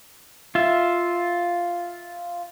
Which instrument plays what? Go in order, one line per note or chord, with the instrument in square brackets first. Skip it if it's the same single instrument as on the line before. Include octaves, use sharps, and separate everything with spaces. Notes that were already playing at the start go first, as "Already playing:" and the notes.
[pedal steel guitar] F4 E5